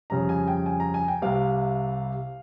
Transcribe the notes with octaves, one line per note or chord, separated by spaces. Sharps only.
F2 C#3 G3 A#5
G#5
G5
G#5
A#5
G#5
G5
C2 C3 G3 F5